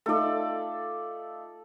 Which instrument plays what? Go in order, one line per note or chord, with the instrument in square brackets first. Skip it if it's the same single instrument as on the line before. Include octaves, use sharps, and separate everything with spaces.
[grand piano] A3 D#4 F4 [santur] A4 D5